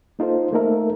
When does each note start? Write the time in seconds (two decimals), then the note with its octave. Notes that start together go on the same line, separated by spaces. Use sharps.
0.19 A#3 D#4 F4 A4 C5
0.53 A3 A#3 D#4 A4 A#4 E5